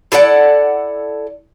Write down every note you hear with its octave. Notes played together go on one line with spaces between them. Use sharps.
E4 A4 D5 F#5